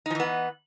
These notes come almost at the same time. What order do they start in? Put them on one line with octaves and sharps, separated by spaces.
D#4 F3 E3 B3